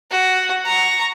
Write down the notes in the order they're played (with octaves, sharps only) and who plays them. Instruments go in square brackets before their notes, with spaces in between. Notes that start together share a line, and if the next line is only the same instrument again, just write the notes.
[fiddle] F#4
A#5 C#6